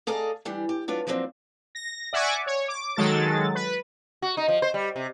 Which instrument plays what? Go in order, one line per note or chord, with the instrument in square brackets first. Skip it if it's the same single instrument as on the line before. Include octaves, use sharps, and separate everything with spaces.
[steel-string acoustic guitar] G#4 A4 D5 D#5 F5 A#5
E3 G3 D4
G4
F#3 D4 F4 B4
F3 F#3 A#3 C4 D4
[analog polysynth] A#6
D5 E5 F#5 G#5 C#6 D6
C#5
D6
D#3 F#3 G#3 A4 A6
B4
[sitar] F#4
D#4
F3
C5
G3
C3